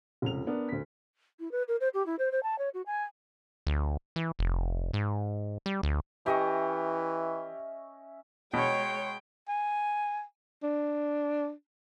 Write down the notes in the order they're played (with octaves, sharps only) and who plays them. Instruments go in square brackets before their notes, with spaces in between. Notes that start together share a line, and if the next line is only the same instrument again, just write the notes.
[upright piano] F1 C#2 F7
B3 D4 A#4
D2 B6
[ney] E4
B4
A#4
C5
G4
E4
C5
C5
A5
C#5
F#4
G#5
[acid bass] D2
E3
F1
G#2
G3
D2
[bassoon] E3 [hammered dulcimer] C#4 D#5 C#6 [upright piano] G4 [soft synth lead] E5
[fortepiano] B2 [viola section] G#3 C#5 C6 [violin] G5
[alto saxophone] G#5
D4